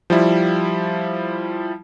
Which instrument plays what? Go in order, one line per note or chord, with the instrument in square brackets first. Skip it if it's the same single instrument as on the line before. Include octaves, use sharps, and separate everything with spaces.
[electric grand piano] F3 G3 E4